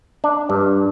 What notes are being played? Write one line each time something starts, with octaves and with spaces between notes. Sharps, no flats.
D4
G2